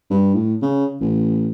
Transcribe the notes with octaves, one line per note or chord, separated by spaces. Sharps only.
G2
A2
C#3
A1